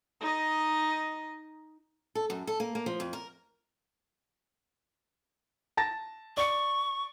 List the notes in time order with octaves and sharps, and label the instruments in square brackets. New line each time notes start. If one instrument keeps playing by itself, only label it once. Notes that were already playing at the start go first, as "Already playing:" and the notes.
[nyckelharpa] D#4 D#5
[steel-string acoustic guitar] A4
F#2
A4
A#3
A#3
F3
F2
A#4
[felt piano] A5 A6 A#6
[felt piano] D5 C#7 [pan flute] C#6